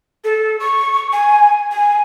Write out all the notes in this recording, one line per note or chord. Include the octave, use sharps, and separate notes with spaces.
A4
C#6
G#5
G#5